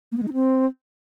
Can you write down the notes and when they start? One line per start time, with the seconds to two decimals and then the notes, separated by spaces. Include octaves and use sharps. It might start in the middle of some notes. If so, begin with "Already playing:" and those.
0.12 A#3
0.17 B3
0.23 G#3
0.28 D#4
0.33 C4